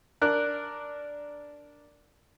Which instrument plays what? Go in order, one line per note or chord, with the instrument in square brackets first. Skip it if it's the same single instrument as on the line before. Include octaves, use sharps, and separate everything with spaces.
[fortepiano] D4 A#4 F#6